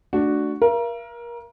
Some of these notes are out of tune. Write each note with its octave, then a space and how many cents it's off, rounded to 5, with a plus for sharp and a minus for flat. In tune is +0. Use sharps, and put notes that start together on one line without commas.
A3 +0 D4 +5 F#4 +0
A#4 +25 F5 -45